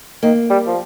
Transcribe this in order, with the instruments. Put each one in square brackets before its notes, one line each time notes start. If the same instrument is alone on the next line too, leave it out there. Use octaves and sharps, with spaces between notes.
[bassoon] D#3 [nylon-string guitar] A#3
[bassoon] G3
F3